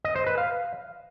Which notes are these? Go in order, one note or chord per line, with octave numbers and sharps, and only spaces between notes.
D#5
C5
B4
F5